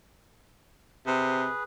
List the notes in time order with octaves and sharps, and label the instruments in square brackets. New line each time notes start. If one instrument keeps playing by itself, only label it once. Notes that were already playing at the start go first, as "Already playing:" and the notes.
[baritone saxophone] C3 [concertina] G#4 B4